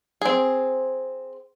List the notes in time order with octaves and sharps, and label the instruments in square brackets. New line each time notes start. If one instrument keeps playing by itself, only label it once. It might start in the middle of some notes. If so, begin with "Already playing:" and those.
[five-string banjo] C4 G#4